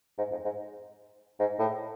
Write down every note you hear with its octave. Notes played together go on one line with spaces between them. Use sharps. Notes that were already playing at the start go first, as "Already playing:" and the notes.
G#2
F2
G#2
G#2
A2